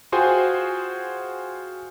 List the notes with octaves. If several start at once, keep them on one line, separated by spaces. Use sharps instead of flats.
F4 F#4 G#4 C5 G5 G#5